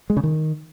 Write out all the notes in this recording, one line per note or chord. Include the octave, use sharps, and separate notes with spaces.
G#3
C#3
D#3